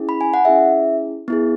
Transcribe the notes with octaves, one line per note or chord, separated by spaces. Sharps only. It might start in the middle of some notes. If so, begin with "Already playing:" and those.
Already playing: C#4 E4 G#4
B5
G#5
F#5
C#4 E4 G#4 E5
B3 E4 G#4